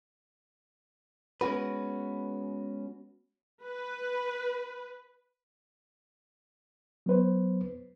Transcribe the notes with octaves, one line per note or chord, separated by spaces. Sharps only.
G#3 B3 C#4 F#4 B4
B4
F#3 B3 B4 C5